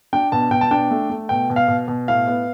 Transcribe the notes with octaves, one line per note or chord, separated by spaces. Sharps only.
D4 G5
B2 A5
B2 G5
A5
D4 G5
A3
A3
B2 G5
B2
F5
B2
B2
A2 F5
B3